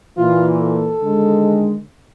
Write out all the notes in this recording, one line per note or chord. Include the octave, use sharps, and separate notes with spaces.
A#2 E3 F4
A4
D3 D#3 G#3